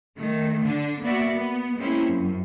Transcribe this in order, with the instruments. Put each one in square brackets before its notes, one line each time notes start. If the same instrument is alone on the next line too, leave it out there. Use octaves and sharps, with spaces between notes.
[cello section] D#3 A3
D3 D4
A#3 B3 F#4 D5 E5
B3
G#3 A#3 C4 C#4 E4
F#2